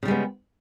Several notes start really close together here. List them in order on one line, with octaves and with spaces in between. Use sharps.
C#3 G3 G#3 B3